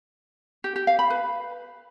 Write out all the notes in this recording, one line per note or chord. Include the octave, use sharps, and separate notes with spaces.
G4
G4
F5
B5
B4